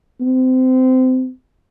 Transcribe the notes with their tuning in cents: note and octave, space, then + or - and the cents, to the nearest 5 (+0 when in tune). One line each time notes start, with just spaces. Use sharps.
C4 -25